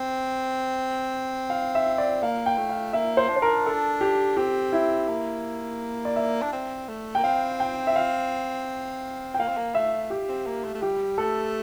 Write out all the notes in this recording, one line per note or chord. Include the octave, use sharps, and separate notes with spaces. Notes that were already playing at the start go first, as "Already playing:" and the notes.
Already playing: C4
F5
E5
D5
A#3 F5
G5
A3
F5
A#3 E5
C5
D4
C5
A#4
A4
G4
C4 G4
E4
A#3
D5
E5
D4
C4
A3
A#3 G5
C4 F5
G5
E5
F5
G5
A#3 F5
C4
A#3
A3 E5
G4
C4
A#3
A3
A3
G3 G4
A3 A4